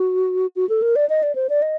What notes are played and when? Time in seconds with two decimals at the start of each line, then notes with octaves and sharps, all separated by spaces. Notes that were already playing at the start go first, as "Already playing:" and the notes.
Already playing: F#4
0.56 F#4
0.69 A4
0.82 A#4
0.96 D5
1.09 D#5
1.23 D5
1.35 C5
1.49 D5
1.62 D#5